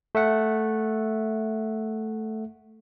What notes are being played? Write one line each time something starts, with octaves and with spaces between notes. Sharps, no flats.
A3 E5 F#5